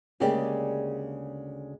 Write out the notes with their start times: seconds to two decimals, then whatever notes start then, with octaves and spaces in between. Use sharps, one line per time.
0.20 D2 C#3 G#3 A#3 G4 D5